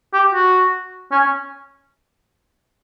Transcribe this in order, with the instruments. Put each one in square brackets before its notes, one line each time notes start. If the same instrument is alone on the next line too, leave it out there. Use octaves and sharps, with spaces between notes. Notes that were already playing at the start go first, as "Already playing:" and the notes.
[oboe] G4
F#4
C#4